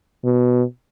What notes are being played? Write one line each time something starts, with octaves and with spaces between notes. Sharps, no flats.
B2